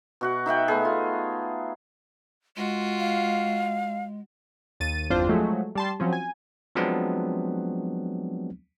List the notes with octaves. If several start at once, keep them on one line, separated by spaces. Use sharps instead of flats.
B2 F#4 F#5
D#4 E5 F#5 G5
A3 B3 G#4
F4
G#3 F4 F#4
F5
D#2 A6 D#7
G1 E2 C4 D4 F4 C5
F3 F#3 G#3 A3
G3 A5 C6
F3 F#3 C4 C#4
G#5
F3 F#3 G#3 B3 C4 D4